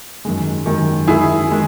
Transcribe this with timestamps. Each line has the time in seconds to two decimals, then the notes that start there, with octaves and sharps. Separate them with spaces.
0.25 F#2 D#3 G#3
0.66 F#2 D#3 G#3
1.07 F#2 D#3 G#3 E4 G#4
1.50 D#3 G#3